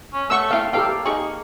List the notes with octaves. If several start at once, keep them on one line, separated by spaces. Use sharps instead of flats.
C#4
A3 B4 C#5 F#5 C#6 E6
C4 E4 F5 G5
A#3 E4 G4 A4 B4 F5 G5
D#4 G4 G#4 C#6